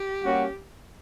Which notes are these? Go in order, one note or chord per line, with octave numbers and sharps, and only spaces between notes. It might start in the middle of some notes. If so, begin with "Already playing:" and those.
Already playing: G4
G3 A#3 C#4 F#4